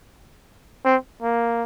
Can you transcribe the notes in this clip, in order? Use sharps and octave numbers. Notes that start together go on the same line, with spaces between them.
C4
A#3